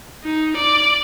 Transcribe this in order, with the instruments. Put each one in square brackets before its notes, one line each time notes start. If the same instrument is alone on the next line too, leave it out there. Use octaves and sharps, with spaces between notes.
[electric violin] D#4
D5